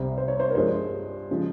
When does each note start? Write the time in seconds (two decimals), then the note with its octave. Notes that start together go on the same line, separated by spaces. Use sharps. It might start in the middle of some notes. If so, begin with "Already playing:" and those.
Already playing: C2 C3 G3 C5
0.18 C5
0.28 C#5
0.40 C5
0.50 A#4
0.55 G2 F3 G#3 C5
1.31 C#3 F3 G#3